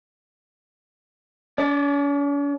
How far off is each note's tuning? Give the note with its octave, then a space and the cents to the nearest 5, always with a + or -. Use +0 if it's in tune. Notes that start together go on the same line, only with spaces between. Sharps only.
C#4 +45 D5 +0